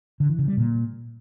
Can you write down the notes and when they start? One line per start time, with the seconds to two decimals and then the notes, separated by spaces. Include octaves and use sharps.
0.20 D3
0.29 E3
0.39 C#3
0.48 G3
0.57 A#2